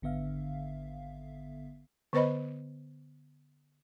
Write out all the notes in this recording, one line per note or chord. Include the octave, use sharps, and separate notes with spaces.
G#1 D3 B3 E5 F5
D3 B3 B4 C5 D#5 B5